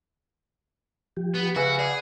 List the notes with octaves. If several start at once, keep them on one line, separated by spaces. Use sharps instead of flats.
F3 G4
B3
C#3 F#4 B4 E5 G#5
G#4 D5 F#5